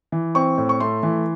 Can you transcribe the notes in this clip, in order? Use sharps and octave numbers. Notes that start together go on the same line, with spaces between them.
E3
C4 C#6
A2
C#6
A3 C6
E3